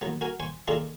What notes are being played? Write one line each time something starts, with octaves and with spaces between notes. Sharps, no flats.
D#2 F#3 B3
F#4 A#4 G#5
C5 G#5 C#6
D#3 A#3 D4 F4 G#4 A4